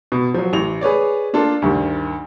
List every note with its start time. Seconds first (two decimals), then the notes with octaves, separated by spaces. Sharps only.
0.12 B2
0.34 F3 F#3
0.53 A1 F7
0.81 G#4 B4 C#5 D5
1.33 A#3 D4 F4 A4
1.62 D2 G2 D#3